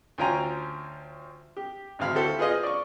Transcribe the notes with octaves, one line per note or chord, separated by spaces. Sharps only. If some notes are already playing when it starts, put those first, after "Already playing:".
D2 C#4 F4 G5 G#5 A#5
G4
G#1 D2 F5 B5
E4 F#4 G4 A4 C5
F4 G#4 B4 C5 D#5 F5
D5 C#6